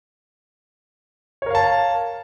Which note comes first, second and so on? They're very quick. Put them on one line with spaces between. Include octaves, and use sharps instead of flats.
C#5 A#4 F5 A5